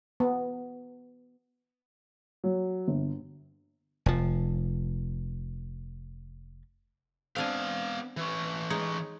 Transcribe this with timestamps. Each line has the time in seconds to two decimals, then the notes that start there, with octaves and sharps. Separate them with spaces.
0.20 B3
2.44 F#3
2.88 G1
4.06 F1 F3
7.36 B3 C4 D4 F5 G#5
8.17 E3 C#4
8.70 G#3 D#4 C#5